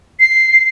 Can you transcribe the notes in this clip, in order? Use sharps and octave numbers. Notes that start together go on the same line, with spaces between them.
C7